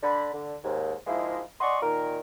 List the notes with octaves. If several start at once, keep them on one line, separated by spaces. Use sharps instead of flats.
D3 B5
D3
D#2 G#2
G#2 F3 G#3 A#3 E4
D5 D#5 F#5 G#5 C6 C#6
A#2 D#3 A#4